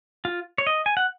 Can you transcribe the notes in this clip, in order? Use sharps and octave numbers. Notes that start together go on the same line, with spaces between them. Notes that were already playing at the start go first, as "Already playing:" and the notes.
F4
C#5
D#5
G#5
F#5